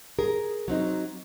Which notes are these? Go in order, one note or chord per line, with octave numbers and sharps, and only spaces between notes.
G#4 A#4
F#3 C4 D#4